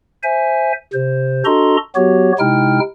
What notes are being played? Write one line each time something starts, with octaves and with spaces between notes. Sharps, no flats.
C5 E5 G#5
C3 C5
D4 F#4 A4 D#5 A#5 C6
F#3 B3 F#4 G4 C#5
C3 G#3 D#4 E4 G5 F6